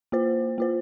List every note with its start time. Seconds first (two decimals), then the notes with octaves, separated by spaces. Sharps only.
0.12 A#3 F4 C5
0.58 A#3 F4 C5